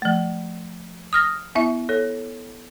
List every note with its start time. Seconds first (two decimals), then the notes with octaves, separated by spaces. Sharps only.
0.02 F3 A3
1.13 D#6 F6 A#6
1.55 B3 E4 E5
1.89 A4 C#5